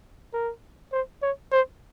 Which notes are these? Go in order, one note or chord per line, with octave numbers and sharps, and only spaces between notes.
A#4
C5
C#5
C5